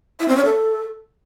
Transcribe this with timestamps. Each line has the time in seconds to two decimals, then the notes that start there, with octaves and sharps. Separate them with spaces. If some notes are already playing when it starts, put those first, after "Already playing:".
0.20 E4
0.28 C4
0.37 C#4
0.45 A4